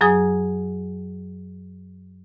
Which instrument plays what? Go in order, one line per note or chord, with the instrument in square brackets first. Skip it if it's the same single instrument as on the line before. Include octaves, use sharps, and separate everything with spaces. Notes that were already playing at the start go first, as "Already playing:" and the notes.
[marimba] F#2 F#3 G#4 G#5 D#6